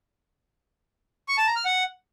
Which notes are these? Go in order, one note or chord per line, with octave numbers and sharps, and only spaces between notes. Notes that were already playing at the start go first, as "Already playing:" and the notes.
C#6
A5
A#5
F6
F#5